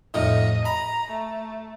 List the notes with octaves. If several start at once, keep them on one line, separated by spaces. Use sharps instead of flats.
F2 A2 D#4 D#5
A#5 B5
A3